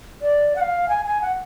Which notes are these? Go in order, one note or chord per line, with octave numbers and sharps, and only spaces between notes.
D5
F#5
F5
G#5
G#5
F#5